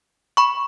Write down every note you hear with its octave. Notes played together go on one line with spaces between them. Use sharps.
B5 C#6